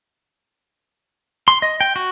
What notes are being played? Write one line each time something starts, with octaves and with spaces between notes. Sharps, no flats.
C6
D#5
G5
F#4